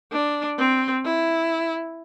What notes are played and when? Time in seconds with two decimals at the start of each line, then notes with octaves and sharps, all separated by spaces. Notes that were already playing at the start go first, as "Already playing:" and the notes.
0.11 D4
0.58 C4
1.05 E4